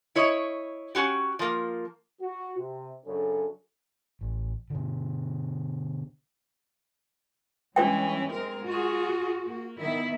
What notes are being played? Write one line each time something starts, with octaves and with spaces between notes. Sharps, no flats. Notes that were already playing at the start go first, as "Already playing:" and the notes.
E4 C#5 D#5
C#4 F#4 G4
F3 A#3
F#4
C3
F#2 C#3 C#4 D4 A4
A1
B2 D3
E3 G3 G#3 C#4 D4 B4 G5
G#3 C4 A#4
F4 F#4 G#4
A#3
D#3 B3 E4 E5